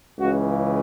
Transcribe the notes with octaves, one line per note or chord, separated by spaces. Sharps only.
C#2 C#3 E3 F#4